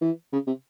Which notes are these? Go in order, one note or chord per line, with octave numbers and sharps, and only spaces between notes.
E3
C#3
C3